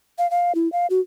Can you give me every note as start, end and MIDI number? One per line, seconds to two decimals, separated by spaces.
0.18 0.29 77
0.31 0.55 77
0.55 0.71 64
0.72 0.87 77
0.90 1.00 66